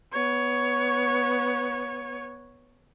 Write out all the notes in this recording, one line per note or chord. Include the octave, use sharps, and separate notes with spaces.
B3 C#5